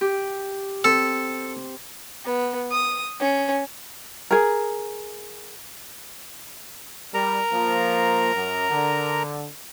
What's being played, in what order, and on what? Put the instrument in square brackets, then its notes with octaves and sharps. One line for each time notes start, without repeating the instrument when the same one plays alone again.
[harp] G4
[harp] C4 [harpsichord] A4
[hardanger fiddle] B3
D#6
C#4
[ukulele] G#4 A#4
[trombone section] G3 [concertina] A#4 A#5
[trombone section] F3 A#3
F#2
D3